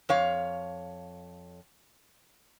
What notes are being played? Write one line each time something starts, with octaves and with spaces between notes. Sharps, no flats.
F2 C#5 F5